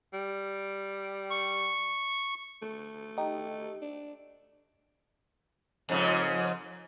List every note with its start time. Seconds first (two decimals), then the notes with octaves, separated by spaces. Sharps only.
0.13 G3
1.30 C#6
2.62 A3
3.18 D#4 G4
3.82 D4
5.89 F2 G#2 C#3